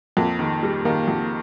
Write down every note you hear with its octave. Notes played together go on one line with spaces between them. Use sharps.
F2 A#3
D#3
G3
D#3 A#3
F2